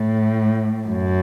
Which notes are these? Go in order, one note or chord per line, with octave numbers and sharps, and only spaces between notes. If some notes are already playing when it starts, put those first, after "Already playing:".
Already playing: A2
F#2